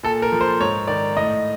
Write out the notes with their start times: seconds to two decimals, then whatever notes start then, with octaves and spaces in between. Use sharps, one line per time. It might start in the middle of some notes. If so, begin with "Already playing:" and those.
0.03 A#2 A4
0.22 A#4
0.32 F3
0.41 C5
0.61 G#2 C#5
0.88 D#3 D5
1.17 A2 D#5